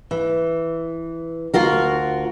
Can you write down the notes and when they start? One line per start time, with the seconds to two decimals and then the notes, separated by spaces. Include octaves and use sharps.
0.11 E3
1.54 D2 F4 F#4 A#4